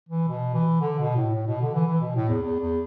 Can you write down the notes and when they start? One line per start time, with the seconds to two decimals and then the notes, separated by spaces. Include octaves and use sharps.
0.09 E3
0.28 B2
0.54 E3
0.81 D3
0.99 B2
1.16 A2
1.35 A2
1.47 B2
1.61 D3
1.74 E3
1.87 E3
2.01 B2
2.15 A2
2.28 E2
2.42 E2
2.60 E2